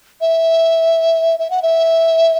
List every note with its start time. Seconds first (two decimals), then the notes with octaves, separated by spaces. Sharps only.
0.21 E5
1.39 E5
1.50 F#5
1.62 E5